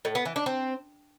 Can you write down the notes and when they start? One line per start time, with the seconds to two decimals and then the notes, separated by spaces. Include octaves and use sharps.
0.05 A2
0.15 B3
0.25 E3
0.36 D4
0.46 C4